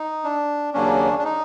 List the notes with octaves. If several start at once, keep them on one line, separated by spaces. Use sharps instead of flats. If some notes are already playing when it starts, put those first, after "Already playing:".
Already playing: D#4
D4
D#2 C#3 F#3 A#3 C#4 D4
D4
D#4